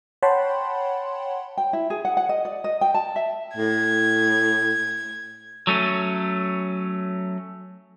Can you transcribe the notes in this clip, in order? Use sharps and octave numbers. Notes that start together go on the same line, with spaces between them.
C#5 F#5 G5 A5 B5 C6
G5
E4
G#4
F#5
F#5
D#5
D5
D#5
G5
A5
E5
A2 G#6
F#3 A3 C#4